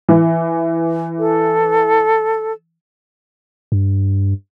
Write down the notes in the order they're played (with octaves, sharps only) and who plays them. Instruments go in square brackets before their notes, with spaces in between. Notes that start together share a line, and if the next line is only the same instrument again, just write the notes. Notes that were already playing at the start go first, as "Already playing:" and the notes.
[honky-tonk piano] E3
[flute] A4
[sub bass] G2